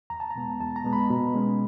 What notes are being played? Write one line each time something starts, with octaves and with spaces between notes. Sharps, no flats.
E2 A#5
A5
A#5
B2 G#3 B3
E2 A5
A#5
B2 G#3 B3
B5
B2
G#3 C#4